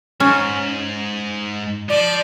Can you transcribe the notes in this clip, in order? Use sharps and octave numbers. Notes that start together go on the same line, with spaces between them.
G#2 C#4
F3 D5